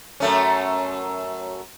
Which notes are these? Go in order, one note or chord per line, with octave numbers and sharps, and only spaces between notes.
F#2 A3 C#4